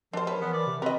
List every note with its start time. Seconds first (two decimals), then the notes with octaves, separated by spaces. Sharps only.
0.13 F3 D4 A#4 C5
0.27 C#4 B4
0.41 E3 B3
0.53 D5
0.66 C3
0.82 C4 A#4 B4 D#5